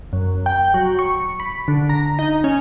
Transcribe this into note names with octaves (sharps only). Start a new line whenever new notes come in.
F#2
G5
F#3
C#6
B5
D3
A#5
D#4
C#4